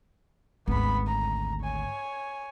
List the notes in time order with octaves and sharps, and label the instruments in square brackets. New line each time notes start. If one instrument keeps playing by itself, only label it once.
[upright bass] G#1 D2 [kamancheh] B3 B5
[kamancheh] A#5
C#5 G#5